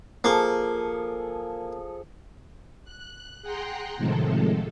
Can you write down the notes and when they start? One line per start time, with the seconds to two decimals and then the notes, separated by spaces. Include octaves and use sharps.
0.24 F3 A#3 G#4 A4
2.84 F#6
3.42 G#4 F#5 G5 A#5 C6 F#6
3.97 A2 C3 D#3 F3 G#3 A4